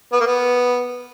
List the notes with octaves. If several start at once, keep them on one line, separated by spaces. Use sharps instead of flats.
B3
A#3
B3